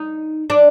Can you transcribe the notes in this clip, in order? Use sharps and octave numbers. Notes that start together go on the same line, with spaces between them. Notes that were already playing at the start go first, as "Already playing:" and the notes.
Already playing: D#4
D4